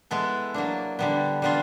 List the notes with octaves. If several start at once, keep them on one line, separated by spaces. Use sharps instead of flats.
G#3 B3 E4 A4
F#3 A#3 D4
D3 G3 B3
G3 B3 D4 F4